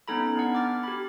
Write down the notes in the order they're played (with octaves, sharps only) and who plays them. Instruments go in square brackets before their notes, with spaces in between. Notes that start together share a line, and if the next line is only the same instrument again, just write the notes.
[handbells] B3 C#4 D#4 A4 A#5 B5
B3 D4 F#5
D6 F6 A6
G4 B5